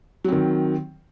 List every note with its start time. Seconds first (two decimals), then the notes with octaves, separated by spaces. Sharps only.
0.24 F#3
0.28 C4
0.32 D#3